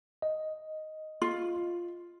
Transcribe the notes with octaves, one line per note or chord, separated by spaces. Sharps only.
D#5
F4